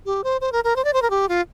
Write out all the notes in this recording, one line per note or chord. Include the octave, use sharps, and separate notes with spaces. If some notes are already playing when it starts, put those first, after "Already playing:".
G4
C5
C5
A#4
A#4
C5
D5
C5
A#4
G4
F4